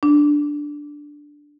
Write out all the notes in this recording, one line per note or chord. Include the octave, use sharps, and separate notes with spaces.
D4